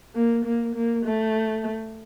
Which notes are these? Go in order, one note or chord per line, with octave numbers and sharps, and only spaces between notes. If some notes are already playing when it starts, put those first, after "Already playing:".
A#3
A#3
A#3
A3